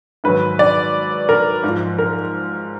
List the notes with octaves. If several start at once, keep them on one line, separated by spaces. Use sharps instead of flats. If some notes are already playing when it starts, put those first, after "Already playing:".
G#2 D#3 F#3 B4
D5
A#4
G#2 F3
A#4